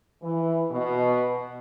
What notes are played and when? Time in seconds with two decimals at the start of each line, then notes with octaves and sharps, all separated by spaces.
0.22 E3
0.71 B2